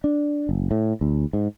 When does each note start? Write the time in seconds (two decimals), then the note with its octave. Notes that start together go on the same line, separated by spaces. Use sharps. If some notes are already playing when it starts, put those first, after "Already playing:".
0.04 D4
0.49 F#1
0.71 A2
1.01 D2
1.33 G#2